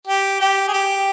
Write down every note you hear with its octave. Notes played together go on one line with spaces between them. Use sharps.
G4
G4
G#4
G4